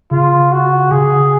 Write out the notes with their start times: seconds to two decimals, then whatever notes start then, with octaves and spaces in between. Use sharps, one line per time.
0.11 C#3 F4
0.52 F#4
0.91 C#3 G#4